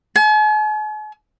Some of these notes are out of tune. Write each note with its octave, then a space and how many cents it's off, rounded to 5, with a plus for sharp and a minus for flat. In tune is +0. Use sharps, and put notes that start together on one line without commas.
G#5 +45